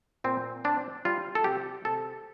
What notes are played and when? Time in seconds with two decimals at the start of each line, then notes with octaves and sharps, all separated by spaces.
0.24 A#2 C4
0.64 C4 D4
1.05 G3 F4
1.35 A4
1.44 C3 G4
1.85 C3 A4